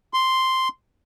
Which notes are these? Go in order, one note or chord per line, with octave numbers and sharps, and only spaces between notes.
C6